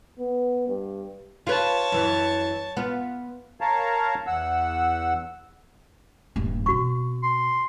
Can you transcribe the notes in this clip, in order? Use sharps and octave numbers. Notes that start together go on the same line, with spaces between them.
B3
G2
F4 B4 C#5 A5
F#2 E3
B3 F4
A#4 C#5 F5 A5 A#5
E2 F#5 E6
D#1 G2
B2 C4 F#4 C#6
C6